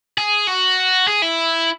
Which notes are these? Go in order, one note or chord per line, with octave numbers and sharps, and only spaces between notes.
G#4
F#4
G#4
E4